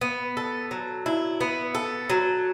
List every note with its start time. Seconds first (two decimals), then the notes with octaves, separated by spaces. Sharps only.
0.01 B3
0.37 A4
0.71 F#3
1.06 E4
1.41 B3
1.75 A4
2.10 F#3